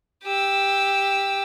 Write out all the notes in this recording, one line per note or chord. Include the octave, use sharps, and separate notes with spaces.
G4 E6